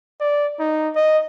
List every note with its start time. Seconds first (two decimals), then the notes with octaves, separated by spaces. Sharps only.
0.20 D5
0.59 D#4
0.95 D#5